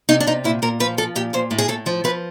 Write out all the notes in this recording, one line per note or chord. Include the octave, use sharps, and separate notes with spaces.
C3 D#4
D4
C3 D#4
A#2 E4
A#2 A#4
F3 B4
F3 A4
A#2 G4
A#2 C5
A2
G#4
A2 A4
F3
F3 B4